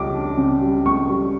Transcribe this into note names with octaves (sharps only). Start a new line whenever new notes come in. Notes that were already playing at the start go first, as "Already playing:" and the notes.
Already playing: C#2 G3 D6
D4
C#3
G3
C#2 C#6
G3